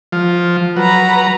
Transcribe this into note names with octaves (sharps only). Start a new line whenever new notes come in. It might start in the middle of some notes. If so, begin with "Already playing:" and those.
F3
F#3 B4 A#5